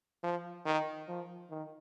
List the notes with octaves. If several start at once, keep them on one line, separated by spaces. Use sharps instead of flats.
F3
D#3
F3
D#3